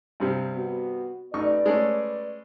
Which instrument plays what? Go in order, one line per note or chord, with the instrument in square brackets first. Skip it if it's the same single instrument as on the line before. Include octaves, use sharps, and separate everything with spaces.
[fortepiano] G2 C3 G3
[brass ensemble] B3 F#4
[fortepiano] A1 D#4 C#6 [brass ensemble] B4 D5
[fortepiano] G#3 A3 C#4